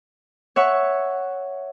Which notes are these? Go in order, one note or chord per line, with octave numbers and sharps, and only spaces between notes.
C#5 E5 F#5 C#6